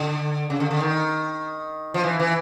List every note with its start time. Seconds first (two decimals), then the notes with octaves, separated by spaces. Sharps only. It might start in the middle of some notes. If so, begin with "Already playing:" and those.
Already playing: D3
0.50 C#3
0.60 D3
0.71 D3
0.81 D#3
1.94 F3
2.04 E3
2.19 E3